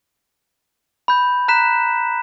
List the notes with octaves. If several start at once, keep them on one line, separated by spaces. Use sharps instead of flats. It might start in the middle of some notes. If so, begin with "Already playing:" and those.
B5 G6
A#5 F#6 B6 E7